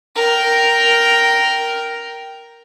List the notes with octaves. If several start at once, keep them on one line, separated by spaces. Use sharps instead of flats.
A#4 G5